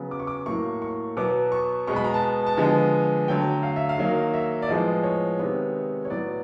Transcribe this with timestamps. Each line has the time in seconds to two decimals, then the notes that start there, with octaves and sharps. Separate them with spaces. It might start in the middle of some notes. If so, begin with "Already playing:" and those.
Already playing: C#3 F#3 B3
0.11 D6
0.20 C#6
0.27 D6
0.46 A2 F#3 A#3 C#6
0.82 C#6
1.17 B2 F#3 B3 D6
1.52 C#6
1.87 B2 G#3 B3 C#6
1.96 B5
2.04 A#5
2.14 A5
2.47 A5
2.57 D3 F3 G#3 B3 G#5
3.28 D3 F#3 A3 G5
3.63 F5
3.76 E5
3.89 F5
3.98 D#3 F#3 A#3
4.33 E5
4.62 D5
4.68 A2 F3 G#3 B3 D#5
5.04 C#5
5.39 C3 D#3 G#3 B3
6.05 C#5
6.09 A2 F#3 B3 D5